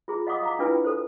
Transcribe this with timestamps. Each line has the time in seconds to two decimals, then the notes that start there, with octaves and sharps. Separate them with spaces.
0.08 F4 G#4 A#5
0.27 D#5 F5 F#5 C6 D6 D#6
0.43 F5 A#5 D6
0.59 D4 E4 F4 B4 G5 G#5
0.84 A4 C5